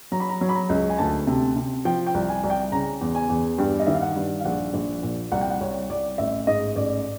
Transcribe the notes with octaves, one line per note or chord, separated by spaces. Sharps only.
F#3 A#5
B5
A#5
F#3
B5
A#5
C#2
G#5
D2 A5
C3
C3
F3 G5
G5
C2
G#5
C2
G5
C#3 A#5
E2
G#5
E2
G2 G5
D#5
D#3 E5
F5
F#5
G2
F5
A#1 F#5
A#1
A#2
C2 F#5
G5
F#5
C2 C#5
C2 D5
A1 E5
G#2 D#5
A1 D5